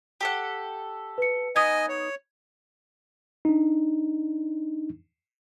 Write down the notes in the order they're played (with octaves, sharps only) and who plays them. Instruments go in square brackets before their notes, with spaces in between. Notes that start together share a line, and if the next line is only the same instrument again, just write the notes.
[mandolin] G4 A4 F#5
[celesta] B4 C#7
[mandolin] B3 D#4 D#6 [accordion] D#5 G#5 [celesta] G#6
[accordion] C#5
[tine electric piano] D4 D#4